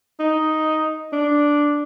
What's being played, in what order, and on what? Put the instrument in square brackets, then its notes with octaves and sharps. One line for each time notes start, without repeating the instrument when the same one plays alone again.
[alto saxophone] D#4
D4